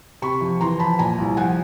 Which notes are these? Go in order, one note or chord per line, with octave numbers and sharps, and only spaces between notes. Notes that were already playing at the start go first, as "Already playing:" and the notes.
C3 B5 C#6
F2
E3 A#5 C6
F2 A5 B5
A#2 G#5 A#5
C2
F3 F#5 G#5